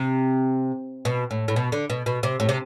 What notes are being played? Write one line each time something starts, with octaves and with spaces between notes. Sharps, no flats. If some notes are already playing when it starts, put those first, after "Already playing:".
Already playing: C3
B2
A2
A2
B2
D3
B2
B2
C3
A2
C3